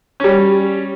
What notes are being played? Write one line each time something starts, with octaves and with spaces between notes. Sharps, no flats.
G3 C#4